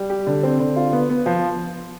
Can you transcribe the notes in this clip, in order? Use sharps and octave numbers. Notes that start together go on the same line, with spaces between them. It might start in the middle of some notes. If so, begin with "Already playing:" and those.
Already playing: G3
G4
D3
C4
D3
F4
B3
B3
F3